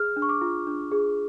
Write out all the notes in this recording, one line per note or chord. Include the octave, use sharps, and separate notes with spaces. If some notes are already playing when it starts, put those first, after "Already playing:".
Already playing: G#4 F6
D4
C#6
D6
F4
D4
G#4